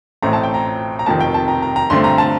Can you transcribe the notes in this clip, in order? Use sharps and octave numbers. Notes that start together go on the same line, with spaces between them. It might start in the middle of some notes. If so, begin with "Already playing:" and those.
A1 A2 A3 C4 A#5
A5
G5
A#5
A#5
F1 F2 C3 D#3 A5
G5
A5
A#5
A#5
A#5
G2 D3 A3 C4 C6
A#5
A5